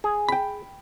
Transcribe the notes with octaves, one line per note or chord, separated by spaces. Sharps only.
G#4
G5 B5